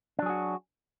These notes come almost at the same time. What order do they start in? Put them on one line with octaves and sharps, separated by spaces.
D4 F#3 G#4 F#4